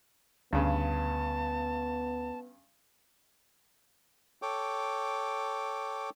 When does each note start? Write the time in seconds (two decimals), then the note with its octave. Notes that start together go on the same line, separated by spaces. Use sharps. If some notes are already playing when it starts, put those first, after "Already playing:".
0.53 D2 G2 C#3 B3 A5
4.42 A4 C#5 G5 D6